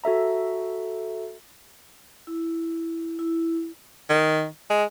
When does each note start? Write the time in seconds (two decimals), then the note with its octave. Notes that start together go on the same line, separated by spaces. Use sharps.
0.04 F#4 A4 E5 A#5
2.27 E4
3.19 E4
4.10 D#3
4.70 G#3